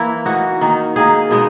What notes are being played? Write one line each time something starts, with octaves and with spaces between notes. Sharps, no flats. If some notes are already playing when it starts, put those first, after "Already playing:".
Already playing: E3 A#3 E4
E3 A#3 D#4 F#4
D#3 A#3 D#4
D#3 A#3 D#4 G#4
B2 G#3 B3 D#4